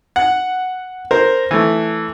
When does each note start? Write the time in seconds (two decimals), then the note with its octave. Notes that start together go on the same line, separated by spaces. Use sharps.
0.16 F#5
1.11 A#4 C5
1.51 E3 A3